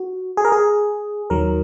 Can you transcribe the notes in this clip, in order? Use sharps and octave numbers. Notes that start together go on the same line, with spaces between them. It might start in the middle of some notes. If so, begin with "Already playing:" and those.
Already playing: F#4
G#4
A#4
G#4
D#2 D#3 F#3 A#4